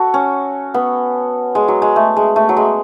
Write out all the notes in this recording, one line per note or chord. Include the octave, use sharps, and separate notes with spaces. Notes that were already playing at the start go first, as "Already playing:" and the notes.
Already playing: F#4 A4
C#4
B3
G#3
F#3
G#3
A3
G#3
A3
F#3
G#3